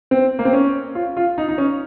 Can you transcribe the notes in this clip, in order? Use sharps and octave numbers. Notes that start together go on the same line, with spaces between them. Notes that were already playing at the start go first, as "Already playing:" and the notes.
C4
A#3
C4
C#4
F4
F4
D#4
D#4
C#4